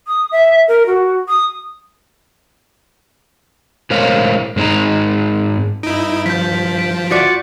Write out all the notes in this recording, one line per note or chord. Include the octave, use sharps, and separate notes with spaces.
D#6
E5
A#4
F#4
D#6
A2 G#3 A#4 C5 C#5 F5
G#2 G#3 C4 D#4 A#5
G2 D#4 E4 D7
F3 G6 B6
B6 D7
F4 F#4 D5 B6